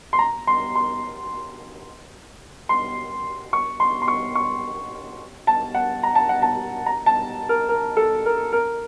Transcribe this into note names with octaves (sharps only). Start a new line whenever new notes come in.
C6
A#5
C6
C6
C6
C#6
C6
C6
C#6
C#6
A5
F#5
A#5
A5
F#5
A5
A#5
A5
A#4
A#4
A4
A#4
A#4